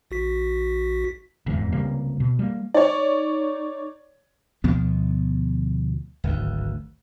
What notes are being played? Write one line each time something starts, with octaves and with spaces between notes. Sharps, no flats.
A#1 F#4 B6
F1 E2 G#2
C#2 C3 G3 A#3
B2
G3 A#3
D#4 C#5 D5
D2 B2 F3 B3
D1 G#1 D2